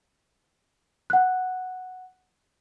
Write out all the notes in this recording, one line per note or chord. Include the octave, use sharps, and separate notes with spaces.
F#5 F#6